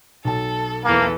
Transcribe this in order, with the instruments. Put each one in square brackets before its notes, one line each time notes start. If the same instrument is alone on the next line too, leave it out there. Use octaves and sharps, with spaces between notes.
[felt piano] B1 A5 [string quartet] A4
[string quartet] E2 E3 A4 [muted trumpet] A#3